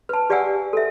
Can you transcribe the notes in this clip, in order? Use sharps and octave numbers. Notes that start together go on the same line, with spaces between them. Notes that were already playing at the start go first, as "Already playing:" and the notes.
B4 A5
G4 D5 F5 F#5 G#5 E6
A4 E5